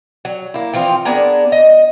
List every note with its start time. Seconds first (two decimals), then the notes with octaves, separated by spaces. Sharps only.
0.25 F#3
0.54 A#3 E4
0.73 E3 F3 C4 F4
1.05 B3 D4 G#4 A#4
1.52 D#5